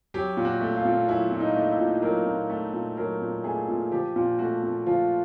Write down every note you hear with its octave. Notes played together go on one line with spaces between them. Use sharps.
F#3 G4
A#2
F#4
A3
F4
A#2
F#3 E4
A#2
D#4
A3
E4
A#2
F#3 A#4
A#2
A3
A#2
F#3 A#4
A#2
A3 G#4
A#2
F3 G4
A#2
A3 F#4
A#2
F3 F4